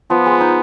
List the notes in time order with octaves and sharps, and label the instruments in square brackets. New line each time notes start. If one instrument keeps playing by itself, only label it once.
[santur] F3 [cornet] B3
[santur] G#3
D#4